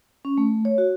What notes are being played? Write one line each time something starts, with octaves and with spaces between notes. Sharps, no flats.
C#4
A3
C#5
F#4